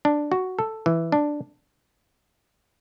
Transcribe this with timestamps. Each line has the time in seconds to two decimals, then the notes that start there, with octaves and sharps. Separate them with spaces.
0.05 D4
0.32 F#4
0.59 A4
0.86 E3
1.12 D4